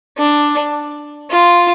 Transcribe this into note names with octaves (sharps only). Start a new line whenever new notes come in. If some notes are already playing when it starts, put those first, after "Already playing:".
D4
F4